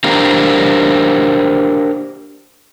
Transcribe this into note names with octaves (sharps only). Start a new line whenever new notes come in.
D4 G4 A#4 C5 F5